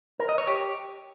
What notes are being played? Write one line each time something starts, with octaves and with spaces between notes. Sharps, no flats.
A#4
D#5
C#5
G4